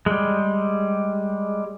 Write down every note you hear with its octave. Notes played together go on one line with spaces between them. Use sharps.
G3 G#3